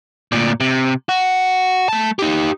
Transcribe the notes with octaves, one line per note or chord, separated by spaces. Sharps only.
D2 A#2
C3
F#4
A3 A5
D#4 G4